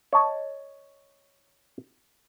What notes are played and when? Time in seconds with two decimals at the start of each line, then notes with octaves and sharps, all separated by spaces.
0.13 C#5 D#5 A5